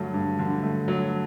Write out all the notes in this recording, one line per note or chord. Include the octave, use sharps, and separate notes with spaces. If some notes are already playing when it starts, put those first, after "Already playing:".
Already playing: G2 D3 F#3 A3
G2
D3
A3
F#3